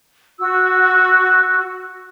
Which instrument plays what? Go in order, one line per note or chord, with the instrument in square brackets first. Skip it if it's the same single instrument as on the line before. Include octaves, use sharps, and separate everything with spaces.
[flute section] F#4 E6